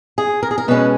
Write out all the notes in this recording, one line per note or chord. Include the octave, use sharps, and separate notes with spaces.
G#4
A#4
G#4
A#4
B2 G#3 C#4 B4